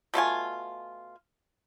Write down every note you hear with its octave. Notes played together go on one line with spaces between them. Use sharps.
B2 A3 F4 G#5